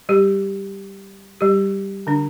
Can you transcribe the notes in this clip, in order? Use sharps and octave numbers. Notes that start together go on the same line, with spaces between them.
G3 G4
G3 G4
D3 D4